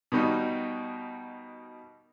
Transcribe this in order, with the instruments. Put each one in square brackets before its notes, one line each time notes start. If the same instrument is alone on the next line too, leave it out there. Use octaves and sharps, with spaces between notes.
[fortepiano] B2 D#3 G3 D#4 F#4